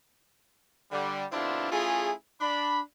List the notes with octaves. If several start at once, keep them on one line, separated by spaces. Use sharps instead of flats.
D3 G3
B2 D3 C4 D4 E4 F4
A3 C#4 E4 F4 G#4
D4 B5